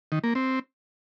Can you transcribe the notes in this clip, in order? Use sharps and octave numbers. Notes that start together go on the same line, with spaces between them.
D#3
A#3
C4